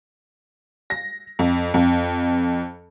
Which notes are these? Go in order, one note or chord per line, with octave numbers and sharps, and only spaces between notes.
A#6
F2
F2